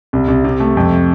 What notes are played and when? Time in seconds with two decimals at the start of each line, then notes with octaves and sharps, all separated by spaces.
0.13 C2
0.28 C2
0.44 C3
0.60 A3
0.77 F2